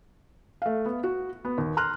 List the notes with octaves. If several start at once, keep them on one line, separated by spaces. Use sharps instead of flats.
A3 F5
B3
F#4
B3
D#2
A#5 C6 F6 F#6